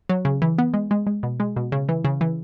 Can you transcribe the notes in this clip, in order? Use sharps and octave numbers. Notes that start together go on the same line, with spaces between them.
F#3
C#3
E3
B3
G#3
G#3
G#3
B2
G#3
B2
C#3
E3
C#3
E3